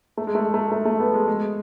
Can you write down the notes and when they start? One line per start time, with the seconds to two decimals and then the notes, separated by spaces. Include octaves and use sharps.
0.17 A3
0.27 G#3
0.35 A3
0.54 A3
0.72 A3
0.85 A3
1.00 B3
1.14 G#3
1.28 G#3